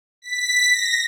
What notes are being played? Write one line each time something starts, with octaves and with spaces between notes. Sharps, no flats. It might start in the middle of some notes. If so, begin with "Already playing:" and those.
B6
A#6